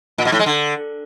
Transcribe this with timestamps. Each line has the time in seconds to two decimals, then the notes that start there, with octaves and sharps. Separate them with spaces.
0.18 A#2
0.25 B2
0.32 A2
0.39 G#3
0.46 D3